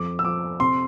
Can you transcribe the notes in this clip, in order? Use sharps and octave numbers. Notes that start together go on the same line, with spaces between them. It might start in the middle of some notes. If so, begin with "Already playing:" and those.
Already playing: F2 D6
E6
F3 D6
C3 C6